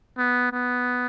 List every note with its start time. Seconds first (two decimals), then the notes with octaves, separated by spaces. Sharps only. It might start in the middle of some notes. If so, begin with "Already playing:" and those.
0.17 B3
0.52 B3